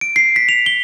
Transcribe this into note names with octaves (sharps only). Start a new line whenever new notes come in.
D7
C7
B6
F7
G7